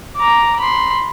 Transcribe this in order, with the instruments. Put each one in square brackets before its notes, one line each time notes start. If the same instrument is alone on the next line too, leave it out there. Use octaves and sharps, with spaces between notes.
[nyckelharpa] A#5 D6
B5 C6